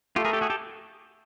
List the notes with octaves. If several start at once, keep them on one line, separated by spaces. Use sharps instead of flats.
A3 F4 G4
G#4 A#4
G4 A4
F#4 G#4
G4 A4